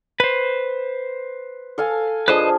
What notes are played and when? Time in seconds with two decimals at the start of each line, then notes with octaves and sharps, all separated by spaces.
0.20 B4 C5
1.78 A4 F5 G#5
2.28 F3 D4 G#4 B4 C5 D#5